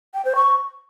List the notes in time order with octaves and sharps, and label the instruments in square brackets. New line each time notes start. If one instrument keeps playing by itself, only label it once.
[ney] G5
C5
C#6